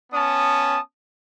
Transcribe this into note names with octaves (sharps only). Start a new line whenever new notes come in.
B3 C#4 A5 D#6